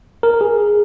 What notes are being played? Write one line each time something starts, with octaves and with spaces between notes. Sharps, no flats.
A#4
G#4